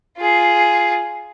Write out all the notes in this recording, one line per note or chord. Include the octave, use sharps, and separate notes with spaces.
F4 G#4